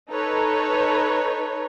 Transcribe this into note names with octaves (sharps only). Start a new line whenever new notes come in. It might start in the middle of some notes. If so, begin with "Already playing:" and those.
D#4 A4 B4 C#5